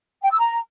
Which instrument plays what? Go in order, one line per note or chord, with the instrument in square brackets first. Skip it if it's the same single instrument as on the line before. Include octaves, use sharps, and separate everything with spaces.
[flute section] G5
E6
A#5